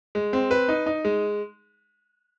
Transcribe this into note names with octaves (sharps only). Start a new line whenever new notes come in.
G#3
C4
B4
D#4
D#4
G#3